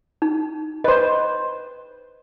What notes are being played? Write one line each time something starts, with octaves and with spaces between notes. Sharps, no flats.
D#4
B4 C5 D#5